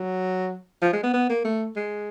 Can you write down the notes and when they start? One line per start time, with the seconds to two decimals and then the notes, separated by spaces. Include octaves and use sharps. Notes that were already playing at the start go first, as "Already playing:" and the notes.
Already playing: F#3
0.82 F3
0.93 G#3
1.03 B3
1.14 B3
1.30 A#3
1.45 A3
1.76 G#3